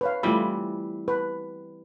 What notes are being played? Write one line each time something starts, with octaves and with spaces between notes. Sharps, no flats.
B4 C#5 F5
E3 G3 A3 C4 F4 B5
B4